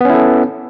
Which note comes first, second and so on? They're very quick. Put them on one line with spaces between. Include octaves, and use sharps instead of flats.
B3 C#4 E4 A4